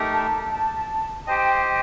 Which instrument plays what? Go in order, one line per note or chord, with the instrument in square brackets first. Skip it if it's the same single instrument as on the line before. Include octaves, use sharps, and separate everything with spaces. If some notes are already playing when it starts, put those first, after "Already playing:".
Already playing: [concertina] A3 D#4 G4 A#4
[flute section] A5
A5
[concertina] G4 C5 D#5 [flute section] G5